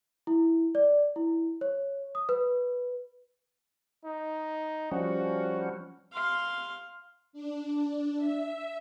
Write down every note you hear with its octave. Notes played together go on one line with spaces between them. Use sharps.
E4
D5
E4
C#5
D#6
B4
D#4
F3 G3 C#4 F#4
F5 C6
D4
E5